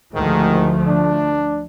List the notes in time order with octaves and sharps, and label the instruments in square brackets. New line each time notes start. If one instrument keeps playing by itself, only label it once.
[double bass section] D2 F3 A3 [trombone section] G#2 D#3
[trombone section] D4